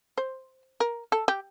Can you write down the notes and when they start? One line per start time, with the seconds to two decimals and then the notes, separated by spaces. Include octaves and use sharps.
0.18 C5
0.80 A#4
1.12 A4
1.28 G4